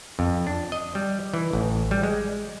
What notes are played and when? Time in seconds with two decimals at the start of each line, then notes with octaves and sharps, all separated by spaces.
0.19 F2
0.47 D4
0.72 D#5
0.95 G3
1.34 E3
1.53 A1
1.91 G3
2.03 G#3